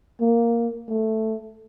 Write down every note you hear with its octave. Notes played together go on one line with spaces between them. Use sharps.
A#3
A3